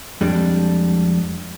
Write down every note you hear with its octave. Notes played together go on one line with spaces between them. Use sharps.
F2 G3 G#3 D4